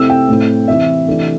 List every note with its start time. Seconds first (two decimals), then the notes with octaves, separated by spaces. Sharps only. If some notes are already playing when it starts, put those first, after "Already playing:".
Already playing: C3 A3 C4 E4 E6
0.10 G5
0.28 A2 A3 C4 E4
0.68 C3 E3 C4 E4 E5
1.07 C3 E3 A3 D4